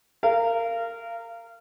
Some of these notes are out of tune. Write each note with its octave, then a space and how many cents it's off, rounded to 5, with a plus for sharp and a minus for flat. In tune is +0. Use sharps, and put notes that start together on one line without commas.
A#4 -20 F5 -25